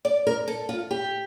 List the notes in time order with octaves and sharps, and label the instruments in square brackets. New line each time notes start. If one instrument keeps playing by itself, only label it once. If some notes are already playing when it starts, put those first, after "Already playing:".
[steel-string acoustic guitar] D5
A#4
A4
F4
G4